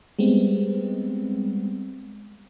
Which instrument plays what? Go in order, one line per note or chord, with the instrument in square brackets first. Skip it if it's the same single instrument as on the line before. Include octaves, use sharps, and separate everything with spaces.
[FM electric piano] G3 G#3 B3 C4